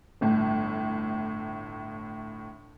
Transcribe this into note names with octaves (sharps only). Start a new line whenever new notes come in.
G1 A2